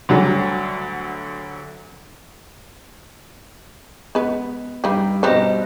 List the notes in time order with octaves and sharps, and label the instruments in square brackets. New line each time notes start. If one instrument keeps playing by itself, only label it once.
[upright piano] D2 D3 F#3 G3
[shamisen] G#3 B4 [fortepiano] B3
[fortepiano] G2 G4 [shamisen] G3 D#4
[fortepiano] G2 B2 [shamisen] F3 G3 D#4 [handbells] B4 C5 D#5